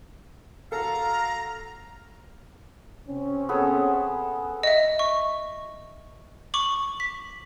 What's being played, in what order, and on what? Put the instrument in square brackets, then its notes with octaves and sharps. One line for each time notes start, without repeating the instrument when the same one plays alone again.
[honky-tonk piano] F#4 A4 [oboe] F5 [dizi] A#5
[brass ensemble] C3 C4 C#4
[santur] B3 G#4 A4
[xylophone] D#5 E5
C#6
C#6 D6 F#7
B6